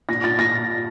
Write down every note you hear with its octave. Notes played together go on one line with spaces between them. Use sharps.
A#2 A#6
A#2 A6
A#2 A#6